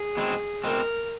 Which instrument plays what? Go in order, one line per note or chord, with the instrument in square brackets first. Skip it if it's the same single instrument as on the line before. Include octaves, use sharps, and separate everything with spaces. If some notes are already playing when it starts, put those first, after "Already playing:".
Already playing: [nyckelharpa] G#4
[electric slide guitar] B2 G#3 C4
[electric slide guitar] B2 G#3 C4 [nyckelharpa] A#4